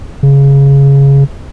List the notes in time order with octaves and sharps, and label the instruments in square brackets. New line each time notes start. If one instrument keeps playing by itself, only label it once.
[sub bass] C#3